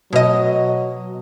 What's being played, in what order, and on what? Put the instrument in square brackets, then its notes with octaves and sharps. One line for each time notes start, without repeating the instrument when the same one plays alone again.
[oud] B2 D#5 [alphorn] F#3